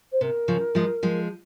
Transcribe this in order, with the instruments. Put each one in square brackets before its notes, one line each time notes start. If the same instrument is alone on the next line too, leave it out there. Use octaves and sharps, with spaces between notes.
[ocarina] C5
[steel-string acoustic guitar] C3 [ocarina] A#4
[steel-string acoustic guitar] C#3 F3
F3 G#3
F3 G#3